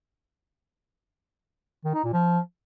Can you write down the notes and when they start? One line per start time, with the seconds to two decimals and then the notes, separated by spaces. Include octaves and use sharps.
1.85 D#3
1.94 D#4
2.04 A#2
2.13 F3